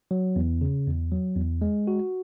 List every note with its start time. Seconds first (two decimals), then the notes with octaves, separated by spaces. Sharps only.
0.11 F#3
0.36 E2
0.61 C#3
0.87 E2
1.12 F#3
1.36 E2
1.62 G#3
1.87 F#4